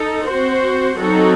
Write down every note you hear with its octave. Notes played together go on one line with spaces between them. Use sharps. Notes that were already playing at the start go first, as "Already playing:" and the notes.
Already playing: D#4 A4
C4 F#4 C5
F#3 C4 D#4 F#4 A4